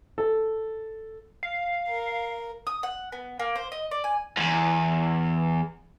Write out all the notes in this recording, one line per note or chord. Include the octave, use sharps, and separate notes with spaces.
A4
F5
A#4
D#6
F#5
B3
A#3
C5
D#5
D5
G#5
E2 G#2